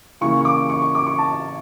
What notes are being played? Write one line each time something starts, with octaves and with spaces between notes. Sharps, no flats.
C#3 E3 A#3 C#6
C#6
D6
C#6
C#6
D6
C#6
A5